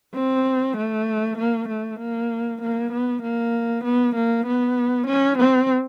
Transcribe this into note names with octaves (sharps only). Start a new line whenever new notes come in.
C4
A3
A#3
A3
A#3
A#3
B3
A#3
B3
A#3
B3
C#4
C4